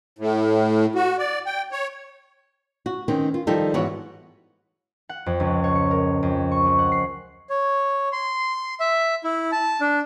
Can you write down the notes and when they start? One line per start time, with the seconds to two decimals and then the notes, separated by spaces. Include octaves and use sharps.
0.19 A2
0.95 F#4
1.18 D5
1.46 G5
1.72 C#5
2.86 F#4
3.08 D#3 C4 C#4
3.34 F4
3.47 D#3 F3 G3 D#4 A4
3.74 G#2 E3 B3 F#4 C#5 F#5
5.09 F#5
5.26 F2
5.40 C#2
5.64 C#5
5.75 C#7
5.91 A#4
6.23 F2
6.52 C#6
6.66 G#3
6.79 F#5
6.92 C7
7.50 C#5
8.12 C6
8.80 E5
9.24 E4
9.52 A5
9.81 D4